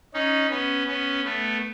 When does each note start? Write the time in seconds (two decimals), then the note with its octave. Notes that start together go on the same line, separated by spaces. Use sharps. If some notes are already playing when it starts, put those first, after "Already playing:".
0.14 C#4 D#4
0.50 B3 C#4
0.87 B3 C#4
1.24 A3 B3